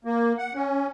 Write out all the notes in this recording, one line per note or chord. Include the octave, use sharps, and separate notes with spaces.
A#3
F#5
C#4